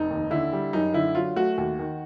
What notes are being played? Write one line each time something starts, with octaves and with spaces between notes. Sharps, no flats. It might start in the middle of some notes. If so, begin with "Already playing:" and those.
Already playing: F1 D#4
D#2
D3 E4
G3
F#2 D#4
D3 E4
F#3 F4
A3 F#4
D#2 F#4
D#3